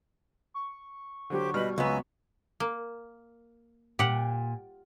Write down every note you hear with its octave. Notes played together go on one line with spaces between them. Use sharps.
C#6
D3 F#3 G4 C5
B2 G3 B4 D#5 F6
C#2 F#3 B3 G#5 A#5 E6
A#3
A#2 G4 F#5